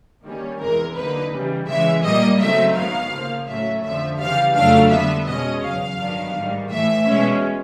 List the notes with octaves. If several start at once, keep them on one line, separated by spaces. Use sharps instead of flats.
D#3 G3 A#3 C#4
E2 C3 E3 G#3 A#4
D3 F#3 A#3 D#4 B4
C#3 E3 G3
C#3 E3 G#3 E5
A#2 G3 A#3 D#5
C#3 F#3 A3 C4 D#4 E5
G#2 D#3 F#3 B3 F5
C#3 F3 A#3
A2 F#3 A3 C#4 E5
F2 D3 F3 E5
C#3 E3 G3 F5
F2 C#3 F#3 A3 D4 F5
D3 G3 B3 E5
B2 G#3 C#4 D#5
E2 C#3 F#3 F5
G2 D#3 F#3 B3 D4
G#2 D#3 G3
A2 E3 A3 E5
B2 G#3 C#4